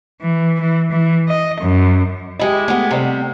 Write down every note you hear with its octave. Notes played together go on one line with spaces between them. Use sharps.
E3
E3
E3
D#5
F#2
G#3 E4 G4 D#5
G#3 A3 B3 D#5
C3 G3